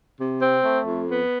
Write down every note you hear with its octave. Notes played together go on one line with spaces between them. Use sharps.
C3
C4
A3
F2
B3